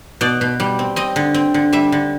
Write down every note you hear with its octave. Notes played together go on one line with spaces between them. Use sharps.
B2 D5
B2
G3
C4
C4 D#5
D3
C4
D3
G3 E5
D3